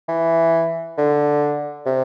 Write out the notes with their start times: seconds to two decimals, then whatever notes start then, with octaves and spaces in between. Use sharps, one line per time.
0.09 E3
0.98 D3
1.86 C3